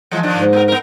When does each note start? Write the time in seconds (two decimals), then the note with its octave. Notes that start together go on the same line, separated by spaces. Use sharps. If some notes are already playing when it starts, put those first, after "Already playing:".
0.11 E3 F3 G#3
0.23 D#3 F3 D4
0.35 G#2
0.53 B3 G#4 A#4
0.68 B3 A#4